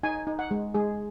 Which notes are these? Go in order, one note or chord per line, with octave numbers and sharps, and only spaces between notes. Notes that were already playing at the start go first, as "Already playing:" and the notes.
D#4 G#5
D#4
F#5
G#3
G#3 G#4